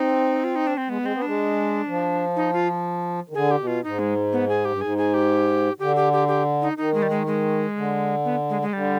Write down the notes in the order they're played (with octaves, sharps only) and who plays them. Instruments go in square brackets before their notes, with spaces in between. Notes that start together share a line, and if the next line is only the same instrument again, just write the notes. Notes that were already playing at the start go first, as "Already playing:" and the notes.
Already playing: [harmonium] C4 [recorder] D#4
[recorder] F4
D#4
D4
C4
[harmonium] G#3 [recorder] B3
[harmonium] G#3 [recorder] C4
[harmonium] B3
[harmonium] G#3 [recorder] D4
[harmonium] F3
[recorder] D#4
F4
[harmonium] D#3
[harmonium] D3 [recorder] G#4
[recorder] G4
[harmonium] B2
[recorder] F4
[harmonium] G#2 [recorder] D#4
[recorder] G#3
B3
G#4
G4
[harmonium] G2
[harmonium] G#2 [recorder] G#4
[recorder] G#4
G4
[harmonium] D3 [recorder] G4
[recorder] G4
G4
G4
D#4
[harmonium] D#3 [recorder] D#4
[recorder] G#3
G3
G#3
G#3
[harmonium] D3
[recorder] B3
G#3
G#3
[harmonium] D3 [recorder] G3